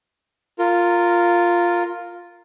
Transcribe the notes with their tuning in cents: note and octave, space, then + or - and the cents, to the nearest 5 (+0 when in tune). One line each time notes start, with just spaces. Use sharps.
F4 +0 A#4 -15